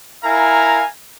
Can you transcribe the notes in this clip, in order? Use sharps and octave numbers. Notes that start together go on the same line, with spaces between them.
E4 A#4 F5 G#5 A#5